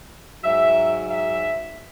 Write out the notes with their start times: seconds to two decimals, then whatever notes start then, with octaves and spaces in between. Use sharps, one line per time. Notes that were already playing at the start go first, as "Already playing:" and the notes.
0.43 G#2 F#3 E5
1.10 E5